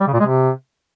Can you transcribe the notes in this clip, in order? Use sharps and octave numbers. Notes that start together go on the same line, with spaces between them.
G3
C#3
A#2
G#3
C3